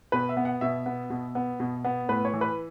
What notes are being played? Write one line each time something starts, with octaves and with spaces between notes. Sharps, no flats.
B2 B4
E5
B3
F#5
B2 E5
B3
B2
B3
B2
B3
A2 B4
C#5
E3
B4